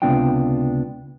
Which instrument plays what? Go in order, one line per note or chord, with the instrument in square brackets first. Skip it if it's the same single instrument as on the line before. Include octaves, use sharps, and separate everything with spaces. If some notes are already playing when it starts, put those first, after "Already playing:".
[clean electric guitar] C#2 C3 B3 D4 F4 G5